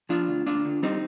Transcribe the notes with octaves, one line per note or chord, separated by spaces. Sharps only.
F3 D4 F4
D2
D2 D4 F4
D3
G3 C4 D#4